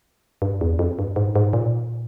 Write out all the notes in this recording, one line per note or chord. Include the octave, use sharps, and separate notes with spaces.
G2
E2
F2
G2
G#2
G#2
A#2